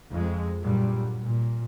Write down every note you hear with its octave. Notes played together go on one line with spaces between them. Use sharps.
F2 G#3
G2 A#2 F#3 G3
A#2